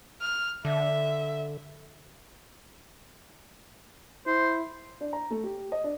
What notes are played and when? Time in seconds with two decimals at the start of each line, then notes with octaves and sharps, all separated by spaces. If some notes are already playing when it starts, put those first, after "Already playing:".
0.21 F6
0.65 D3 E5
4.27 E4 C5
5.00 D4
5.13 A#5
5.31 A3
5.44 G4
5.72 D#5
5.84 D4